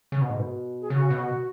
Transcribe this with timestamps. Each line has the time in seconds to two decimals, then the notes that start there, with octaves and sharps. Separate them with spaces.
0.12 C#3
0.22 B2
0.30 G#2
0.39 B2
0.81 G#4
0.90 C#3 F#4
1.10 B2